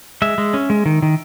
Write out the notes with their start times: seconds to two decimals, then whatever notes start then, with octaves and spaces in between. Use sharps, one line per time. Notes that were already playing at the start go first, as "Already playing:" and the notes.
0.22 G#3 E5
0.38 G#3
0.54 C#4
0.70 G#3
0.86 D#3
1.02 D#3